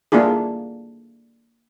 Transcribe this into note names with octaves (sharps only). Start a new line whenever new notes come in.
A#3 D4 E4 F4 G#4